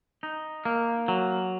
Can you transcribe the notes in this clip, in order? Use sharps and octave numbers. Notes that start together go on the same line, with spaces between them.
D#4
A#3
F#3